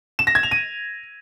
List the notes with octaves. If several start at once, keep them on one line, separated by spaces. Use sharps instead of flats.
E7
A#6
G#6
F7
D#7